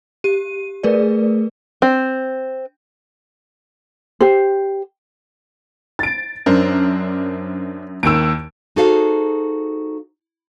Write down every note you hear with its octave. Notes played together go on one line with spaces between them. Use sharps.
G4 D#7
A3 G#4 A#4 B4 D5
C4
G4 C5
A6 D7
F#2 D4 A#4 C5
D#2 D#3 E6 D7
D#4 F#4 G#4 A4 C5 F5